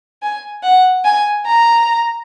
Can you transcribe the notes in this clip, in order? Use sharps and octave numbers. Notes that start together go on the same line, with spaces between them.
G#5
F#5
G#5
A#5